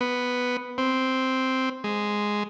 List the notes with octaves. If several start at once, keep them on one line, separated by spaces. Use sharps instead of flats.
B3
C4
G#3